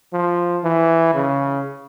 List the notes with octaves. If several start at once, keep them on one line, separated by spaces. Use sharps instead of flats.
F3
E3
C#3